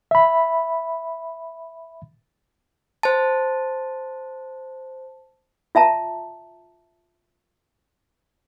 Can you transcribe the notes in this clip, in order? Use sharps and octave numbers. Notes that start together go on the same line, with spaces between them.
E5 B5
C5 A5
F4 E5 A5 A#5